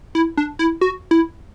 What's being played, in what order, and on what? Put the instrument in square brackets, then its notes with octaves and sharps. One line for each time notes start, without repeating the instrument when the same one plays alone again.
[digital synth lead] E4
D4
E4
F#4
E4